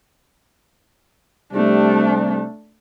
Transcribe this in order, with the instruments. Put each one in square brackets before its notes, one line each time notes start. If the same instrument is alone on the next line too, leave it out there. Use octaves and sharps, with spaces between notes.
[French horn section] C3 G3 [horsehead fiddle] A3 D4